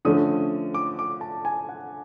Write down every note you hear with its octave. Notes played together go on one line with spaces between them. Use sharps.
D3 F3 A3 C#4 D#6
D6
D6
A5
G#5
F#5